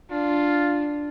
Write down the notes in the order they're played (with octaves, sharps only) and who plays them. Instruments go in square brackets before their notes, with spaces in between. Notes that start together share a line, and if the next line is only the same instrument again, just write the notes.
[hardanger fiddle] D4 [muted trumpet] F4